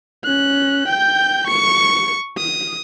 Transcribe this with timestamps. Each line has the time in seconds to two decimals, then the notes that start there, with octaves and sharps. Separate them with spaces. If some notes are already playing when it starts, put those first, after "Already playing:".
0.25 C#4 F#6
0.88 G5 G6
1.47 C#6 C#7
2.38 D#6